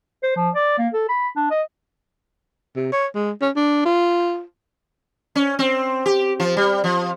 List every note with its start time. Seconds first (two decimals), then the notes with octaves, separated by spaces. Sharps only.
0.23 C5
0.36 F3
0.55 D5
0.78 A#3
0.93 A4
1.09 B5
1.36 D4
1.50 D#5
2.76 C3
2.93 C#5
3.15 G#3
3.42 C#4
3.56 D4
3.85 F4
5.36 C#4
5.59 C4
6.06 G4
6.40 F3
6.57 G3
6.84 F3